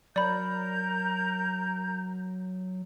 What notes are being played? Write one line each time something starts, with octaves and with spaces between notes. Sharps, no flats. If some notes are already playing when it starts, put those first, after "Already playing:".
F#3 A#4 D5 A#5 B5 G6